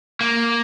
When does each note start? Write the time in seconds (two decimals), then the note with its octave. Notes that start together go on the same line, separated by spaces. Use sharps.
0.21 A#3